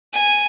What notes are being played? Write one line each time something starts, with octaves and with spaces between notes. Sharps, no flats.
G#5